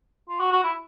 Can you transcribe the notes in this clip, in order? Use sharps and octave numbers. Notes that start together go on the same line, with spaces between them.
F4
F#4
F#4
E4